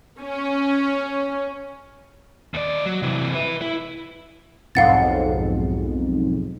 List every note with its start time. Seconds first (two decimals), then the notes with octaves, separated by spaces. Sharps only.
0.20 C#4
2.54 D#2 D5
2.85 F#3
3.02 C3 E3
3.35 B4 E5
3.62 E4
4.75 B1 F2 G#2 F5 F#5 A6